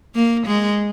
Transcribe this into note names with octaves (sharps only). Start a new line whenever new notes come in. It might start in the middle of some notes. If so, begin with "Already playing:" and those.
A#3
G#3